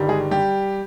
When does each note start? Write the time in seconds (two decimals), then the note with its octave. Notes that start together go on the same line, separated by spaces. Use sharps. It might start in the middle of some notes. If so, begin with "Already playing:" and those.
Already playing: G1 G2 D#3 G3
0.08 G#3 G#4
0.31 G3 G4